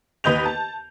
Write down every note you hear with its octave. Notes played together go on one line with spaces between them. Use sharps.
D#2 B4 D#5 G6 F7
A5